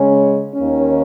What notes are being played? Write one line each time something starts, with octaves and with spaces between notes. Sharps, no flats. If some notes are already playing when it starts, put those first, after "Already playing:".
Already playing: C#3 G#3 C#4
D#2 D#3 A#3 C#4